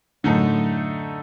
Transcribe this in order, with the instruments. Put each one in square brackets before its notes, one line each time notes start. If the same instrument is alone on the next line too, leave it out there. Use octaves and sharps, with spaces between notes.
[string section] F#2 A2 [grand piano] D3 A3 D#4 A4